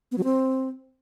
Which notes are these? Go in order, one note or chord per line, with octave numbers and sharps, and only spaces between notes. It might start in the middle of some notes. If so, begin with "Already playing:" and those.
B3
F#3
C4